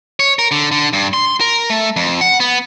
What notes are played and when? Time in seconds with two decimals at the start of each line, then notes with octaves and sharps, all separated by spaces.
0.20 C#5
0.39 A#4
0.52 D3
0.71 D3
0.93 G2
1.14 C6
1.41 A#4
1.70 A3
1.96 F2
2.21 F#5
2.40 B3